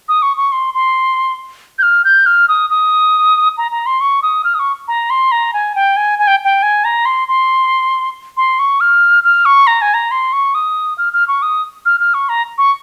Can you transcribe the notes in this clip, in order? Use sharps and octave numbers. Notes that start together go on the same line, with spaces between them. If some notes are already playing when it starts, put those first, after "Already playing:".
D#6
C#6
C#6
C6
C6
G6
F6
G6
F6
D#6
D#6
A#5
A#5
C6
C#6
D#6
F6
D#6
C#6
A#5
C6
A#5
G#5
G5
G#5
G#5
G5
G5
G#5
A#5
C6
C6
C6
C#6
F6
F6
C#6
A#5
G#5
A#5
C6
C#6
D#6
F6
F6
C#6
D#6
F6
F6
C#6
A#5
C#6